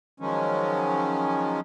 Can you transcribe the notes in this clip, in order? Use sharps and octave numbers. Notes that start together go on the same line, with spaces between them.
D#3 F3 F#3 G#3 C#4